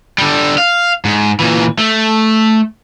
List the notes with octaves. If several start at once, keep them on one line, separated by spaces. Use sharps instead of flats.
D3 G3
F5
G#2
A#2 E3
A3